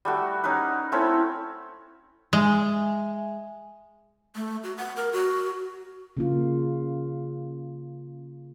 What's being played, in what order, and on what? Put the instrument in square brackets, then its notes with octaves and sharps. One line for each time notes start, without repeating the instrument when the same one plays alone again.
[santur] G3 A3 F#4
C#4 D#4 A#4 B4
A3 C4 C#4 E4
[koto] G#3 [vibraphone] E5 G#5
[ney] A3
F#4
F#5
A#4
F#4
[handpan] C#3 A#3 F4